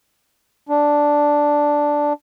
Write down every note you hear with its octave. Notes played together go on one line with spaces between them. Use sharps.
D4